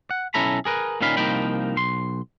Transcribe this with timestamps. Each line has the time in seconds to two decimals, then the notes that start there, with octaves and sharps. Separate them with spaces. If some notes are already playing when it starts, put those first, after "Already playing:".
0.11 F#5
0.34 B1 C#4 E4 A4 A#5 B5
0.65 G#4 A#4 B4
1.01 A#2 D#3 C#4 D#4 F5 B5
1.17 C2 F3 A#3 D#4 G5 B5
1.76 B1 C6